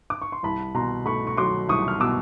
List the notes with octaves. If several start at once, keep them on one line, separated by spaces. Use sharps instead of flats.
D6
C#6
C6
C2 A5 B5
B2 A#5 C6
A3 B5 C#6
C#6
F#3 C6 D6
C2 C#6 D#6
F6
B2 D6 E6